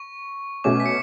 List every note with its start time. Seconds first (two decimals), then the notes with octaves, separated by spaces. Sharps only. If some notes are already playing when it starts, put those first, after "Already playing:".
Already playing: C#6
0.64 B2 A3 C#4 D6
0.80 B6
0.86 C#7